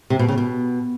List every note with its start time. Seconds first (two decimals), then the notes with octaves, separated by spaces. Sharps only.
0.10 C3
0.19 B2
0.28 C#3
0.38 B2